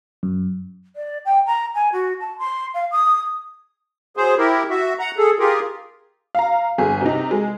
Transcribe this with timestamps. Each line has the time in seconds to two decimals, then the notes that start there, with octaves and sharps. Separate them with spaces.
0.23 F#2
0.96 D5
1.25 G5
1.46 A#5
1.75 G#5
1.93 F#4
2.20 A5
2.39 C6
2.74 F5
2.92 D#6
4.17 F#3 G#4 C5
4.38 E4 G4 A#4
4.70 F#4 E5
4.99 F#5 A#5
5.18 G#4 A4
5.39 F4 G4 G#4 A#4
6.35 F5 A#5
6.78 G1 G#4
7.01 C3 D#4
7.31 G#3